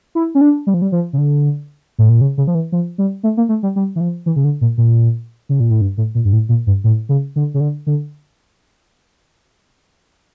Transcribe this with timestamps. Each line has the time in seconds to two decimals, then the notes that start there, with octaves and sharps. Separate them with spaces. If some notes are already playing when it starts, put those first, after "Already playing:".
0.15 E4
0.35 C#4
0.41 D4
0.67 G3
0.74 F3
0.82 G3
0.92 F3
1.13 C#3
1.18 D3
1.99 A2
2.09 A#2
2.21 C#3
2.38 C#3
2.47 F3
2.55 E3
2.72 F3
2.98 G3
3.23 A3
3.37 A#3
3.49 A3
3.63 G3
3.76 G3
3.96 E3
4.01 F3
4.26 E3
4.36 C#3
4.44 D3
4.61 A#2
4.78 A#2
5.49 C#3
5.60 A#2
5.70 A2
5.81 G2
5.97 A2
6.15 A#2
6.25 G2
6.33 A2
6.49 A#2
6.67 G2
6.84 A2
7.09 C#3
7.36 D3
7.54 C#3
7.60 D3
7.87 D3